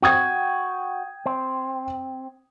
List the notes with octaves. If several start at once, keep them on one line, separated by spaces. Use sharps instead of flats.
F#4 G5 D#6 G#6
C4